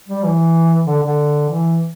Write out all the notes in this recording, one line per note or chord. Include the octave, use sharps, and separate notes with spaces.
G3
E3
D3
D3
E3